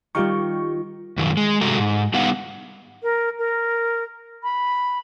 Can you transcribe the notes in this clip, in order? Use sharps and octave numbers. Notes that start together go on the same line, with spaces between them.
D#3 G3 F4 G4 C#6
F#2 D#3 F3
G#3
G2 C3 G#3 F#4 A4 A#5
G#2
G3 B3 D#4 F5 F#5
A#4
A#4
B5